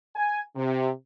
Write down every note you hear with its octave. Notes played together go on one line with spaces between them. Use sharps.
G#5
C3